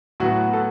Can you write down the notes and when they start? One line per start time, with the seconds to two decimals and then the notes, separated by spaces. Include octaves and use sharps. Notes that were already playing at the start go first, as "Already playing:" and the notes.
0.20 A2 F#3 B3 F#4
0.53 A4